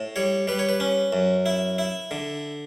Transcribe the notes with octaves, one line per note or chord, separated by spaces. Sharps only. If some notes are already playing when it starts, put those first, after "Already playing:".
Already playing: A2
G3 C#5
G3 B4
C#5
B4
C#4
F#2
E4
E4
D3